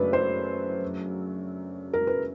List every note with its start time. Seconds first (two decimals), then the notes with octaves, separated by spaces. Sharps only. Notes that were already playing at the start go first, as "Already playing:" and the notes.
Already playing: F#2 C#3 F#3 A3 D4 B4
0.13 C5
1.93 A#4
2.07 B4